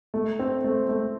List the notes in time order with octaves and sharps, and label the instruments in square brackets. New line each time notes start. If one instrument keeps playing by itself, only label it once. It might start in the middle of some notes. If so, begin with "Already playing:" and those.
[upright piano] A3
C4
A3
A3